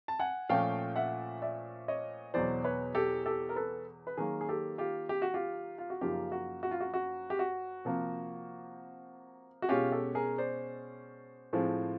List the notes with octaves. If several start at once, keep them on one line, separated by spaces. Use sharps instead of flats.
A5
F#5 G#5
A#2 F3 A3 C#4 F5 G5
E5 F#5
D5 E5
C#5 D#5
E2 B2 F#3 C5 D5
B4 C#5
G4 A4
G4 A4
A#4
A4 B4
B4
D#3 F#3 A#3 G#4 A#4
G#4
G4 A4
F4 G4
G4
F#4
F4 G4
F4
F#4
F#2 C#3 F3 A#3 D#4 F4 G4
F#4
F#4
F4
F#4
F#4
G4
F#4
C3 F3 A#3
F#4
B2 G#3 C#4 F4 G4
G4 A4
G#4 A#4
C5 D5
A2 F3 G#3 C4